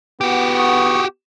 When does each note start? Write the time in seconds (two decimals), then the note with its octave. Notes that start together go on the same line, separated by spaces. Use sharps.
0.21 B3 F#4 G4
0.57 C#6 D#6